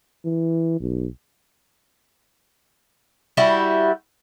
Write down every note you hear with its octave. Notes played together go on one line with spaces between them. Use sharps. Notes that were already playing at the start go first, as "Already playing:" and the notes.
E3
B1
G3 E4 F#4